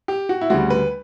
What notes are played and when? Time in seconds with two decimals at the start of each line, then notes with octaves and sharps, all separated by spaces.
0.08 G4
0.29 F#4
0.41 E4
0.50 D2 C#3 G3 F#4
0.70 B4